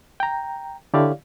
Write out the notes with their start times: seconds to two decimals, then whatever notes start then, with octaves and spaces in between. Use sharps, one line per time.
0.20 G5 A#5
0.94 D3 E4 G4 C#5 D5 F5